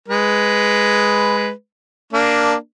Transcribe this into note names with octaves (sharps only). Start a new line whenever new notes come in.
G#3 B4
A#3 D4